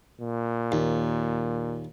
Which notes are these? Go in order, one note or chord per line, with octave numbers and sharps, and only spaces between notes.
A#2
D#2